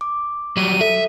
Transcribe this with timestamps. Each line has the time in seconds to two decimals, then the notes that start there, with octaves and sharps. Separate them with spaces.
0.01 D6
0.57 F#3 G3 D#7
0.81 A4 E5